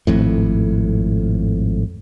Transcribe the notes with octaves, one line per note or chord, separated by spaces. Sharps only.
G#1 F2 A2